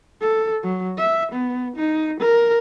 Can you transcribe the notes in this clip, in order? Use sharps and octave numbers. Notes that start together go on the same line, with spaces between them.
A4
F#3
E5
B3
D#4
A#4